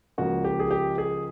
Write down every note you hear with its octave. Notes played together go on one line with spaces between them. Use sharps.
C#2 C#3 F3 A#3 F#4
G4
G#4
G4
G#4